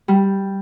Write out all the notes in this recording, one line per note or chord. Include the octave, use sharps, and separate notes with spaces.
G3